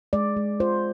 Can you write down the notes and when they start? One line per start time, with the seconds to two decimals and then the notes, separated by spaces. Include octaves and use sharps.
0.13 G#3 D5
0.37 G#3
0.60 F4 C5